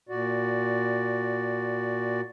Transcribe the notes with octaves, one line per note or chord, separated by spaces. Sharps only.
A#2 F#4 D5